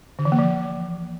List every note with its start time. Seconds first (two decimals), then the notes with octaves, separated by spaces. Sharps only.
0.19 D3
0.25 E3
0.32 A#3
0.39 F3